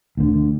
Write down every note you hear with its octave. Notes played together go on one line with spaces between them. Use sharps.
D2 D3